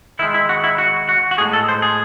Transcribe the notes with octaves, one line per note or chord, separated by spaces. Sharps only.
D#3 G#3 E4
E4
F#4
E4
F#4
F#4
F#4
A2 G#3 G#4
A4
C5
G#4